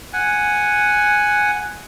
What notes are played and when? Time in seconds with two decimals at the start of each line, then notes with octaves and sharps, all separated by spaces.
0.13 F#5 G#5